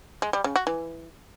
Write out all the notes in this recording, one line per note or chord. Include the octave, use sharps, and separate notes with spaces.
G#3
G3
C#3
F#4
E3